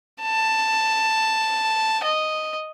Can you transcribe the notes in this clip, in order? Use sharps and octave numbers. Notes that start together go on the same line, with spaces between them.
A5
D#5